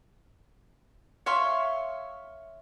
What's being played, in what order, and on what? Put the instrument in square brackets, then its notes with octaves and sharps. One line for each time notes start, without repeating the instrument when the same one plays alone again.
[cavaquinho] C#5 E5 F5 C6